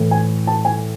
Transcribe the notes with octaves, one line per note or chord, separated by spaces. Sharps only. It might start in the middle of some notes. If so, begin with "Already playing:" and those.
Already playing: A2 E3
G#5
A5
G#5